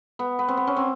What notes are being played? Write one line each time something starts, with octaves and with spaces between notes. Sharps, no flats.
B3
B3
C4
B3
C#4
C4